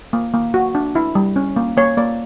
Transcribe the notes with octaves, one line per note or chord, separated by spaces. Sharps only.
A#3
A#3
F#4
D4
E4
G3
C#4
A#3
A#3 C#5
A#3 D5